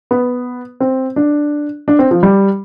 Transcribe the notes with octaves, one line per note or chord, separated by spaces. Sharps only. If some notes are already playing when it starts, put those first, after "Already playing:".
B3
C4
D4
D4
C4
F3
G3